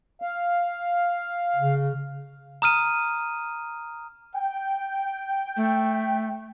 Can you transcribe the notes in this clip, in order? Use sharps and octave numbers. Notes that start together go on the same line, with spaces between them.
F5
C#3
A#5 D#6 F6 D#7
G5
A3